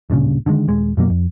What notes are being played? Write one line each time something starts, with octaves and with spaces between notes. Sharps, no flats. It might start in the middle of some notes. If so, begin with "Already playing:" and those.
D1 G2 A#2 C#3
D3 D#3 F#3 G#3
D#1 G#3
F#2 B2 F#3 A#3
F2